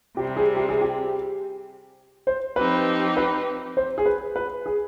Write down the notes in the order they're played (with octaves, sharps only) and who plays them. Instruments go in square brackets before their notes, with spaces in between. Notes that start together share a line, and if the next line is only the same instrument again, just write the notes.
[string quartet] C3 G3 C4 [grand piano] G4
[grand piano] G#4
G4
G#4
G4
C5
[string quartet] F3 C4 D#4 G4 [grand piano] B4
[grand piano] B4
C5
G#4
B4
B4
G#4